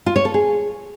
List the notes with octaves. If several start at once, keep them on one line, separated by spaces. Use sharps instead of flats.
F4
C#5
A4
G#4